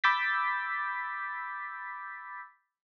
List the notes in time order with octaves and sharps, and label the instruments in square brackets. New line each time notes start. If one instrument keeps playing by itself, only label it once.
[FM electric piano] B5 D6 E6 G6 A6 B6